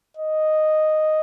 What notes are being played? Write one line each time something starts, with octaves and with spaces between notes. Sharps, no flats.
D#5